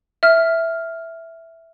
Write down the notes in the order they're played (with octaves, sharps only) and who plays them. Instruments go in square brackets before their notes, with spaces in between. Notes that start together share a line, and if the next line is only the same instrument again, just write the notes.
[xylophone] E5 F6